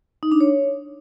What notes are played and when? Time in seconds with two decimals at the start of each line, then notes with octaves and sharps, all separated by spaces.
0.23 D#4
0.32 D4
0.40 C#5